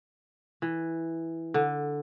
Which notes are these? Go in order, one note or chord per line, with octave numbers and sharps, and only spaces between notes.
E3
D3